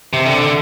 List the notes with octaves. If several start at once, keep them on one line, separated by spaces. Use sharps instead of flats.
C3
D3